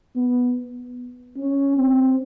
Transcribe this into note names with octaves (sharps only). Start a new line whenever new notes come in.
B3
C#4
C4